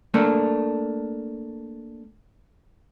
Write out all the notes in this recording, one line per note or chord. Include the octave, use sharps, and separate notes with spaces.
A3 A#3 D4